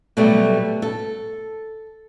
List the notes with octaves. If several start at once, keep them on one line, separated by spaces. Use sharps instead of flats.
B2 F#3 G3 A3
A4